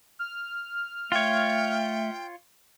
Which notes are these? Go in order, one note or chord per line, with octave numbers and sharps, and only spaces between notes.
F6
A3 F4 C#5 E5 G5